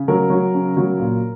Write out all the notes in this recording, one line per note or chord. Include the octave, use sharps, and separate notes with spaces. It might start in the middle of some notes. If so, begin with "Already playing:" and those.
Already playing: C#3
F#3 A#4
F#3
C#3
F#3
A#2